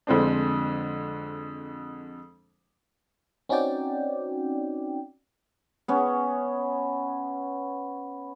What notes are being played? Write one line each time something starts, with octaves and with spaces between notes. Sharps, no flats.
F2 D3 G#3 C4 D4
C4 C#4 D#4 F#4 D5 G5
B3 C#4